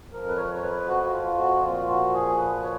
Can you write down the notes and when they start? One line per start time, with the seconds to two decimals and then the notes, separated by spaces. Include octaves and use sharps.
0.12 F2 F3 A#4
0.28 B4
0.37 C#5
0.55 C#5
0.63 B4
0.88 F#4
1.03 F#4
1.13 F4
1.38 F#4
1.62 A#2 F3 F4
1.88 F#4
2.14 G#4
2.38 B4
2.63 C#5